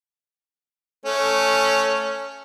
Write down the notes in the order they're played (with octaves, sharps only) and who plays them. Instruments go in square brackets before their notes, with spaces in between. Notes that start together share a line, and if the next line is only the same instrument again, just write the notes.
[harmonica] A3 C#4